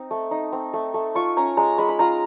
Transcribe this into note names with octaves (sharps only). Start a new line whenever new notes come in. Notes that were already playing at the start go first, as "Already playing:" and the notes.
Already playing: C4 D#4
A3
D#4
C4
A3
A3
F4 C#6
C#4 A#5
G#3 A#5
G#3 B5
B5
F4 A#5